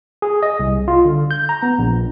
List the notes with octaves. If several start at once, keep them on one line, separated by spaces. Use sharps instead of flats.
G#4
D#5
C2
F4
D3
G6
A#5
B3
A#1